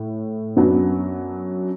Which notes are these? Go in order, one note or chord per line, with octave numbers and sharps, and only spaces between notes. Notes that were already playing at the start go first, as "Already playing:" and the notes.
Already playing: A2
F#2 F#3 B3 D4